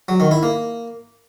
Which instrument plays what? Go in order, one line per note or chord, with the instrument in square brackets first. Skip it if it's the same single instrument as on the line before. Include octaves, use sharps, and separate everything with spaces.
[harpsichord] F#3
D#3
E4
A#3